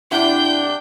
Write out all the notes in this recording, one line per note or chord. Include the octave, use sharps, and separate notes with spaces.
C3 D4 E4 E5 F#5 G5 G6